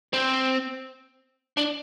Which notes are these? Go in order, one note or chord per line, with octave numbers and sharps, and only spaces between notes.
C4
D4